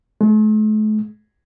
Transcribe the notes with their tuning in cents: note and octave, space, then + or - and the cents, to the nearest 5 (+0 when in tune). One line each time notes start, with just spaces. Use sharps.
A3 -45